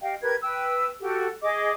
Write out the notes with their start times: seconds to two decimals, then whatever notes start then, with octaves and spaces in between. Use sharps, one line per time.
0.02 G4 D#5 F5 G5
0.22 G4 A#4 B4 G#6
0.43 B4 G5 E6
1.01 F#4 G4 A4
1.42 G#4 D#5 D6